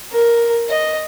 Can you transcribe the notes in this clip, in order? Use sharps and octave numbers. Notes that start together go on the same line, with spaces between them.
A#4
D#5